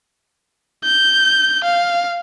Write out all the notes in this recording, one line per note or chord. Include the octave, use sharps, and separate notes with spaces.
G6
F5